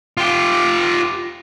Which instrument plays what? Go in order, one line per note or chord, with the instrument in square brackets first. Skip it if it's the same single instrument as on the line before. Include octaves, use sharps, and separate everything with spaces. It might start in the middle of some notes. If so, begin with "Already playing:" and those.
[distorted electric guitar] F4 G4